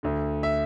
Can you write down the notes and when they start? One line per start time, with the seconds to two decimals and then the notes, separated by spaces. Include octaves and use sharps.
0.03 D2 D3
0.43 E5